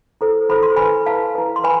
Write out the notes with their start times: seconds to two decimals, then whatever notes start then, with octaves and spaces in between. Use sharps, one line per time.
0.21 E4 A4 C5
0.49 E4 A4 C5 B5
0.63 C6
0.76 E4 B4 G#5 B5
1.06 E4 B4 F5 A5
1.35 E4 B4
1.56 C6
1.64 B4 G#5 B5